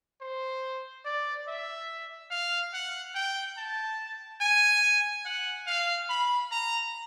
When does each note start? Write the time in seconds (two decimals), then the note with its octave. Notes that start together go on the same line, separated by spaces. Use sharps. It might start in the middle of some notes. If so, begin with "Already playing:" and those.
0.21 C5
1.05 D5
1.48 E5
2.31 F5
2.74 F#5
3.15 G5
3.57 A5
4.41 G#5
5.25 F#5
5.67 F5
6.09 B5
6.51 A#5